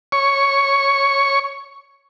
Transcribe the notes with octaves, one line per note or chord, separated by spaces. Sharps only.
C#5 C#6